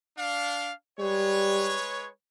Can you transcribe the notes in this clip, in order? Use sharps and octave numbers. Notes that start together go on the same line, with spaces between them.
D4 F5
G3 G#3 B4 C#5